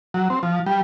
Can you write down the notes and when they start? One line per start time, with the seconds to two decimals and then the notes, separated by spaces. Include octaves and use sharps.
0.14 F#3
0.30 C4
0.43 F3
0.66 G3